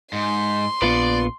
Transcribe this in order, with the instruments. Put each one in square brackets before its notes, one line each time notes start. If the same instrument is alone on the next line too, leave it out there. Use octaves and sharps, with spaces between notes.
[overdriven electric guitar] G#2 [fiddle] C6
[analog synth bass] A#1 [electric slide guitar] B3 F4 B4 [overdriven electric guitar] D5